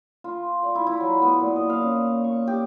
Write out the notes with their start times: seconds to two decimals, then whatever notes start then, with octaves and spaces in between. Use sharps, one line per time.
0.24 F4
0.63 D5
0.75 E4
0.87 E4
1.00 F#3
1.22 B3
1.40 A#2
1.56 D#5
1.70 F5
1.82 C#4
2.24 C#6
2.47 G4